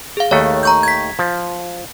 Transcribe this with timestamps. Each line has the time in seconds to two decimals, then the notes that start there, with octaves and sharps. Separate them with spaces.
0.17 G#4 F5
0.31 D#2 D#3 A3 C#5
0.63 A#5 C#6 G6
0.83 G#6 B6
1.19 F3